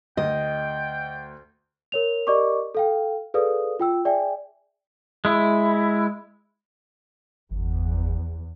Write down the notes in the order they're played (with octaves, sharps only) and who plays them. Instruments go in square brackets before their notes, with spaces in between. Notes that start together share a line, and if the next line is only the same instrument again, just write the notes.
[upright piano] D2 [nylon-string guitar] D#5 [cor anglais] G5
[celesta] A#4 C#5 F7
G4 A#4 D5 D#5 C#6 D6
A4 F5 G5
G#4 A4 B4 D5 F5 D#6
F4 G5 E6
G#4 D5 E5 G5 G#5
[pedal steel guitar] G#3 E4
[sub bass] G1 [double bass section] E2